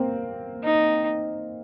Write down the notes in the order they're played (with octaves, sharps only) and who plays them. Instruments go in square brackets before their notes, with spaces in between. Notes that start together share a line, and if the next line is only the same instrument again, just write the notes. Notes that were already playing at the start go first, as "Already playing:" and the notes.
Already playing: [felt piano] A#3 C4
[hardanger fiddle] D#4